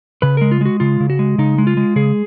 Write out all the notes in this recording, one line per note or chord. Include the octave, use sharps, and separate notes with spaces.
C#3 B4
G#3 A#4
F4
G#3 F#4
C#3 F4
C#3
F#4
G#3
C#3 D#4
G#3
F4
G#3
C#3 G#4